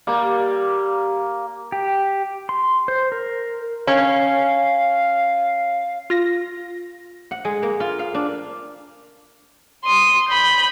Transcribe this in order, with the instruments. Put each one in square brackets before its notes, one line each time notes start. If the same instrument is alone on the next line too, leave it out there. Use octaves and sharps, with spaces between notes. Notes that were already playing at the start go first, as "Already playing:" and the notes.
[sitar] G3 [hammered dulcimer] A#3
[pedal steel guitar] G4
C6
C5
A#4
[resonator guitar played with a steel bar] C#4 [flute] F5
[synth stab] F4 A#6
[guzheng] F#5
G#3
A#3
F4
F5
D4
[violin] C6 D#6
B5 G6